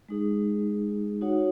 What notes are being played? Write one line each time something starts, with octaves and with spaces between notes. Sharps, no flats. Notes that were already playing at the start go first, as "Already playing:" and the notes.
G#3 D#4 G#4
D#4 F#4 C#5 F#5